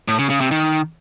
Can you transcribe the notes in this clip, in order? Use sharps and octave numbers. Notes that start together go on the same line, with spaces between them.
A2
C#3
C#3
C3
D#3